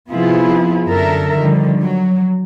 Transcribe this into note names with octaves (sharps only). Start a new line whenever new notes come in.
C3 F3 B3 E4 F4 G#4
F#2 D3 A4 A#4 E5
D3 D#3 F3 G3
F#3